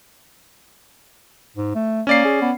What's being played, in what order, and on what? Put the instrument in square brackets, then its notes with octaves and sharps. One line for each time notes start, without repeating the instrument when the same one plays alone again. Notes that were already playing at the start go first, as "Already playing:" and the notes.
[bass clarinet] G#2
A3
[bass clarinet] A#3 [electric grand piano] C#4 D5 C7
[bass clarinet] G#4
B3